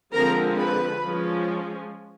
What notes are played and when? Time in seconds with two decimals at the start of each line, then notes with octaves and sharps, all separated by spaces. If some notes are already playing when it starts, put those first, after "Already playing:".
0.13 D3 F3 G#3 C4 A#4 A#5
0.58 B4 B5
1.04 F3 G#3 C#4